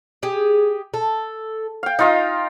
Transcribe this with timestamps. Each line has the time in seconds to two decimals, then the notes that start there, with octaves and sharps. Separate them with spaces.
0.23 G4 G#4
0.94 A4
1.83 F5 G5
1.99 D#4 F4 D#5 F5